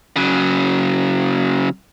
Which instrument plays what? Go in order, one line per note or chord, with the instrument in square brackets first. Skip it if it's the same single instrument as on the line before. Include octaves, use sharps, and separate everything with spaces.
[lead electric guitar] C#3 F#3